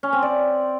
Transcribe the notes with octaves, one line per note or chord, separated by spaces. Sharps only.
C#4
C4
D5